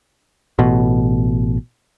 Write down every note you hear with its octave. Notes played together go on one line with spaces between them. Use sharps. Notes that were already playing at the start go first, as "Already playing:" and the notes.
A1 B2